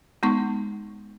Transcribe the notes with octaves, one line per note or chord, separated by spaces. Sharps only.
G#3 B3 D#4 C#6